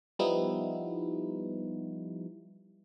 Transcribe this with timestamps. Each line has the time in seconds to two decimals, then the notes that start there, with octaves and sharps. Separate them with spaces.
0.19 F3 G3 B3 D#4 E4